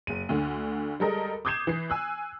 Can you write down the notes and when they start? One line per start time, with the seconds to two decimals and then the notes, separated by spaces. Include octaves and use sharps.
0.07 F#1 D#7
0.29 D2 D3
1.00 G3 G#3 A4 A#4 D#5
1.45 D6 D#6 G6 G#6 C7 E7
1.67 E3 C7
1.90 G#5 E6 F#6